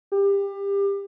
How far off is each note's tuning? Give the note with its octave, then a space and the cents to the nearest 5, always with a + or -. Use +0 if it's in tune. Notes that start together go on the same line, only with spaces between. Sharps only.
G4 +25